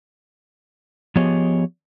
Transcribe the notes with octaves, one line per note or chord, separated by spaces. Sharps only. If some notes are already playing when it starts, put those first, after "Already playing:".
F3 B3 G4 G#4 C#5 D#5